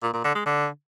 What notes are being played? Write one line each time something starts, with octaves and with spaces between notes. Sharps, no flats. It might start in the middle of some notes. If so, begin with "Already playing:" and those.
A#2
A#2
D3
G#3
D3